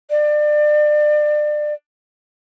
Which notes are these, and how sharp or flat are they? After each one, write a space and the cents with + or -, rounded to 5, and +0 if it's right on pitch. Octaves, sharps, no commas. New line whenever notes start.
D5 +30